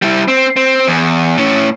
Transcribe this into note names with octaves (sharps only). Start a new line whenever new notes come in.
G3 E4
C4
C4
E2
A2 C#4